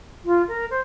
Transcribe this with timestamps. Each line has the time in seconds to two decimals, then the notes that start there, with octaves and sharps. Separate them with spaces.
0.25 F4
0.47 A#4
0.70 C5